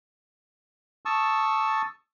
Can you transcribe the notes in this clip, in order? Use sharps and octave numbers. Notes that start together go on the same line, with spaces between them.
A5 C#6 D#6 E6